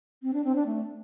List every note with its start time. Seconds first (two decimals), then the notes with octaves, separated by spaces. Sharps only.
0.23 C4
0.34 D4
0.44 C4
0.55 D4
0.66 A3